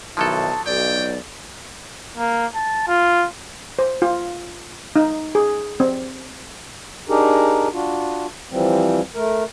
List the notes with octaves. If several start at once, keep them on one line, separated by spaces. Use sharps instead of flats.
B1 D#3 F3 F#3 E4 A4 A5
B1 D5 G5
A#3
A5
F4
C5
F4
D#4
G#4
C4
D4 D#4 G4 G#4 A#4
D4 F4 F#4
E3 F3 G3 C4
A3 A#4